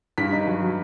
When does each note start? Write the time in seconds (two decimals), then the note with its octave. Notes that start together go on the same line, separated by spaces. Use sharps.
0.18 G2 B6
0.32 D#4
0.47 F#3
0.62 F#3